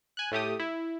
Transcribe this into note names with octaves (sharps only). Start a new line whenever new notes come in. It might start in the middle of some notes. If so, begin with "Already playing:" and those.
G#5 F#6
A2 A3 G4 D#6
E4